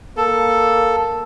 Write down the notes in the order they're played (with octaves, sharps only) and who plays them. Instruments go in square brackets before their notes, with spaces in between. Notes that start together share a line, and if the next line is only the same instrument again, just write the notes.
[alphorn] A#3 [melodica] A4